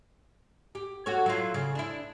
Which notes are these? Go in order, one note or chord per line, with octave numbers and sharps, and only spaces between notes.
G4
F#4 A4 C#5
F#3 E4 F4
C#3
D4 E4